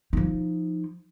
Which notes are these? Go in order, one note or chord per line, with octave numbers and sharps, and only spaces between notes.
F3 D#4